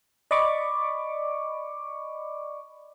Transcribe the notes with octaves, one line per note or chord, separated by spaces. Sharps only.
D5 D#5 B5 C#6 D6